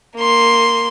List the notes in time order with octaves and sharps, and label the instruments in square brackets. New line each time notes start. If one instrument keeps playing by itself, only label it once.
[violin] A#3 C6